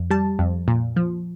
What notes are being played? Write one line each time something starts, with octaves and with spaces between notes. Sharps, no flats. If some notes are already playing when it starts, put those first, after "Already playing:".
Already playing: F2
G3 A5
F2
A#2
F3